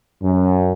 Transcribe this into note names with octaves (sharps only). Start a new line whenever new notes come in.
F#2